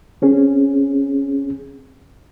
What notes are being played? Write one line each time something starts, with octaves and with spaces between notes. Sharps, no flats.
C4 C#4 G#4